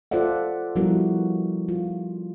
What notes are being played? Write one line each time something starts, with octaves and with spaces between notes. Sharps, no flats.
F4 A4 C5 D5 E5 F#5
F3 G3 B3 E4 F#4 A#4
F4